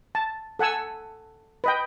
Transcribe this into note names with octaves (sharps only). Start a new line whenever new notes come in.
A5
A4 F#5 G#5 E6
B4 D#5 G5